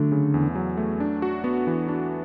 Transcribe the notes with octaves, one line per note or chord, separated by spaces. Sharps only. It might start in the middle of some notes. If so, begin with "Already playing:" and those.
Already playing: D3 F#3 A3
C#3
E2
F#3
A3
D4
F#4
B3
E3
D4